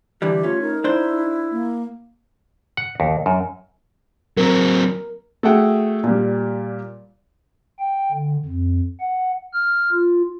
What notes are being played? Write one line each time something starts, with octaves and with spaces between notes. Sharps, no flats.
D3 E3 G3 G4
A3 C#4 F4
D#4 A#4
D4 E4 C5
A#3
F#5
D#2
F#2
F#3 C4 A#4
A3 F#4 G#4 E5 F#5 G5
A#2 G3
G5
D3
F2
F#5
F6
F4